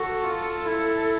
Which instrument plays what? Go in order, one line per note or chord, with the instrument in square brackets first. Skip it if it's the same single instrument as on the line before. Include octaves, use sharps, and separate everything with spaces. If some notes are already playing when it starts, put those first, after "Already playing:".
Already playing: [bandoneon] F#4 [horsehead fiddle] A4
[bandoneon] F4
E4